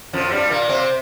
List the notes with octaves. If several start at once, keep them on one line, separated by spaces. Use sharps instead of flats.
F2 F3
G2 G3
A#2 A#3
C3 C4